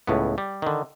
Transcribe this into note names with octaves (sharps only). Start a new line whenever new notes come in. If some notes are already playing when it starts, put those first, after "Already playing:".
C#2 A2 B3
G3
D3 D#3